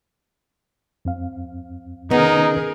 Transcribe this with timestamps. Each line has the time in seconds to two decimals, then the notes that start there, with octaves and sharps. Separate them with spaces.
1.05 F2 C4 F5
2.11 C3 D#3 B3 C#4 D#4 G#4 A#4